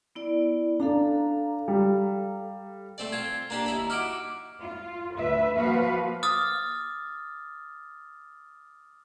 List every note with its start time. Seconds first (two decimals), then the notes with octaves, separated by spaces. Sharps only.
0.15 B3 E4 D5
0.80 D4 A4 F5 A#5
1.68 G3
2.98 A3 C4 D5
3.12 C4 F4 G#6
3.50 A#3 D4 G4 A#5
3.66 D#2 E4 B5
3.90 D#4 E4 F#4 D6 F6 D7
4.60 F4
5.16 D2 B4 E5
5.54 F3 A#3 F#4 B4 F5
6.23 D6 D#6 F6 A6